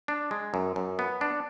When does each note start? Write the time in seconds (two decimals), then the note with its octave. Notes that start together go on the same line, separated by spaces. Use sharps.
0.08 D4
0.31 G#3
0.54 F#2
0.76 F#2
0.99 B3
1.21 D4